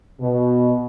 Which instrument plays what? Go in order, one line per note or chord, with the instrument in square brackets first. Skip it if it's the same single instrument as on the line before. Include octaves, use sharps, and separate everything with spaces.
[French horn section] B2